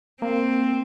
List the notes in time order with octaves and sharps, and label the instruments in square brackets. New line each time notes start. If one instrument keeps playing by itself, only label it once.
[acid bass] A#3 [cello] C4